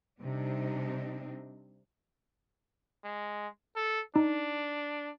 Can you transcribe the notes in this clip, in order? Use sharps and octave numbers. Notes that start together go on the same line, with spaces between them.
C3 G3 C4 D4 D#4
G#3
A4
D4 D#4